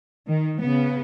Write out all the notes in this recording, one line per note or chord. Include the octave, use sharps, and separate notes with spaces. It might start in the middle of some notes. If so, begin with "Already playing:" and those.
D#3
C#3 B3